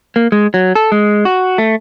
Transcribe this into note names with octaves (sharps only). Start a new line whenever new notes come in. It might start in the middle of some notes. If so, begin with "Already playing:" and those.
A#3
G#3
F#3
A4
G#3
F#4
A3